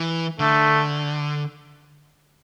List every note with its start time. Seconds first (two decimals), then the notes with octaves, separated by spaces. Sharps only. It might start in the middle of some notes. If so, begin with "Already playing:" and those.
Already playing: E3
0.39 D3 A3